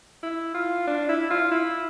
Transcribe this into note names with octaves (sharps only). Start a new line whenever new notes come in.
E4
F4
D4
E4
F4
E4